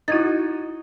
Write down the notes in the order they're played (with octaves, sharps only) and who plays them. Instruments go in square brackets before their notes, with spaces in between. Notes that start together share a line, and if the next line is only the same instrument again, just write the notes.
[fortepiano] D#4 F#4 [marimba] E4 G#6 A6